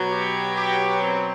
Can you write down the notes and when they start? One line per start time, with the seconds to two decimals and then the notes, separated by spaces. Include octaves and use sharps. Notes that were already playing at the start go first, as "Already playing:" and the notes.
Already playing: B2 F#3
0.10 G4
0.56 G4
1.01 C4